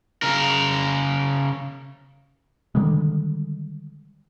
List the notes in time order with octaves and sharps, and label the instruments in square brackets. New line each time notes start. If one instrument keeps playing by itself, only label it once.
[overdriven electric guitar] C#3 A#4
[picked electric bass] D3 D#3 G3 G#3